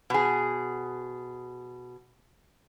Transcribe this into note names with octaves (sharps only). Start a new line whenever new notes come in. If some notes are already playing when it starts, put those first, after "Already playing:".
B2 G#4